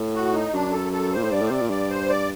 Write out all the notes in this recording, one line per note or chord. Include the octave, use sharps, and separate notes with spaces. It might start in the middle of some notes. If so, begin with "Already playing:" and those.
Already playing: A2
F#4
D#4
F#2 D4
A4
A4
A#2 C5
A2
G2 D5
A2
C5
C3 D5
A#2
G2 D5
C5
D5